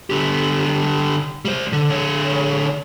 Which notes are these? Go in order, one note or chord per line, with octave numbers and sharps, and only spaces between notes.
D3 G4
G3 C5
D3
D3 C#5